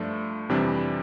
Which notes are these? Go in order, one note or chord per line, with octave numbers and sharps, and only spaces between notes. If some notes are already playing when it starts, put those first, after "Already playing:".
Already playing: G2 F3 A3 D4 F4
F2 C3 E3 G3 D4